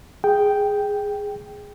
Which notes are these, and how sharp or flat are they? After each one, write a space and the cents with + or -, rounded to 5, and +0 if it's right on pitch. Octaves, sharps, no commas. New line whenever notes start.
G#4 -5 G5 +0